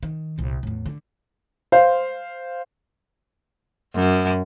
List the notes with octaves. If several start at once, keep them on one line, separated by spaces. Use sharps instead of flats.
D#3
C2 A#2
E2 A2
D3
C5 F5
F#2